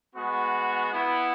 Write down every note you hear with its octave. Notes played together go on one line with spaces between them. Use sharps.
G#3 B3 F#4
B3 E4